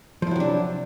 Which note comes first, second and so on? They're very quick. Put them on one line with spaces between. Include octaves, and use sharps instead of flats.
F3 E4 F#3 C3 D4